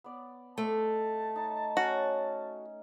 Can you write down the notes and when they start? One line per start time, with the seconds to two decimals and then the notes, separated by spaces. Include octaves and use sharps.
0.04 B3 D5
0.58 A3 C4 D#5 A5
1.36 D#4
1.77 C#4 F#4